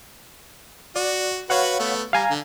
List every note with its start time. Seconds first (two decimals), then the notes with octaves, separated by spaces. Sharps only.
0.96 F#4 D5
1.50 F#4 B4 C#5 F5 F#5
1.79 A3 B3
2.13 G3 F5 G#5 A#5
2.30 D3